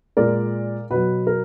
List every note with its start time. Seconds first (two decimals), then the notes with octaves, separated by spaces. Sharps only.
0.17 A#2 G#3 A#4 D5
0.90 B2 F#3 B4
1.27 A#4